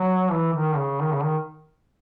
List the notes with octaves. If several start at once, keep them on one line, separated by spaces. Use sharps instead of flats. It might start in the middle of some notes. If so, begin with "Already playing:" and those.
Already playing: F#3
E3
D#3
C#3
D#3
C#3
D#3